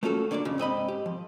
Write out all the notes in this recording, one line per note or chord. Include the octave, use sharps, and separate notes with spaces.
A3 A#3 C#4 F4 F#4 A4
D3 A#3 D4 C#5 D5
F2 C#3
G#2 C4 D#5 B5
G4
F3